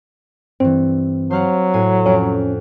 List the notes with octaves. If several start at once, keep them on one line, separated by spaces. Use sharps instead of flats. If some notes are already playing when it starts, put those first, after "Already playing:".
G2 E3 C4
F#3 C5 F5 F#5
A2 G#5 C7
F2 C#4 F#5 D7